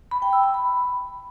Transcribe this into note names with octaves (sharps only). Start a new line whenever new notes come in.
B5
G5
E6
B5
B5